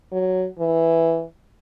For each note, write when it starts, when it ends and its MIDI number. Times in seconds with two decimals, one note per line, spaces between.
0.12 0.45 54
0.59 1.24 52